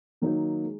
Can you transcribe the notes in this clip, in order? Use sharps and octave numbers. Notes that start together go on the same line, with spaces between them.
D#3 F#3 A#3 D#4
G#3